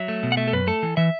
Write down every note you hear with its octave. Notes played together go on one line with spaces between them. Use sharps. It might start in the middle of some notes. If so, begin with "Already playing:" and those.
Already playing: F#3 E5
A3
B2
F#5
A3 E5
A4
F#2 B4
A3 A4
E3
E3 E5